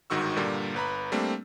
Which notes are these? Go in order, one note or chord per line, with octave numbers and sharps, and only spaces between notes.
G1 G#2 D#3 F#4 C#6 E6
G2 A#2 D3 G3 A#3
G1 B4 A#5 B5
G3 A3 A#3 C4 D4